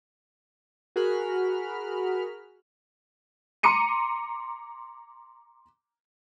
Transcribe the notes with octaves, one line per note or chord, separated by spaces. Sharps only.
F#4 G#4 A#4 B5 F6
A#5 C6 D6 C#7 D#7